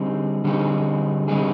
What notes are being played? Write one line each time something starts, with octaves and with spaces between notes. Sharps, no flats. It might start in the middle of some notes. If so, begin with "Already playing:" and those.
Already playing: D3 G3 C4 D#4 G#4
D3 G3 C4 D#4 G#4
D3 G3 C4 D#4 G#4